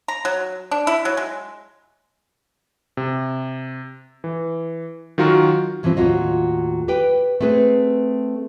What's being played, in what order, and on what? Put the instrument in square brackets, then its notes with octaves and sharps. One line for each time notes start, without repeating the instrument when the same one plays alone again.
[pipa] A#5
F#3
D4
E4
F#3
G#3
[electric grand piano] C3
E3
D#3 F#3 F4 F#4 A#4
[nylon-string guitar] G2 E3 F3 B3 C4
D#2 A2 F#3 F4 D#5
G4 B4 G5
A3 C4 G#4 B4